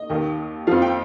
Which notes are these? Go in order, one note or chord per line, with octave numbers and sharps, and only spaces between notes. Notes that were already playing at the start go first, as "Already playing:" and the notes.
Already playing: D#5
D#2 D#3
F2 F3 F5
G5